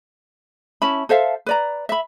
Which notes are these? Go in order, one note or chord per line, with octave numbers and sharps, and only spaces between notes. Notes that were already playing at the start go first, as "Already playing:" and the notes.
C#4 E4 A5 B5
A4 C5 E5 F5
B4 D5 A#5
E5 B5